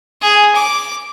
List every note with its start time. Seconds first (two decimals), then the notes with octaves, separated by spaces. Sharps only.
0.21 G#4
0.55 D6